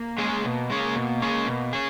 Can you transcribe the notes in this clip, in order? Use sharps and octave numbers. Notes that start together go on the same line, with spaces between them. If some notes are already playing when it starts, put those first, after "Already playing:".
Already playing: A#3
G#3 C#4 G#4
B2 A#3
G#3 C#4 G#4
B2
G#3 C#4 G#4
B2
C#4 G#4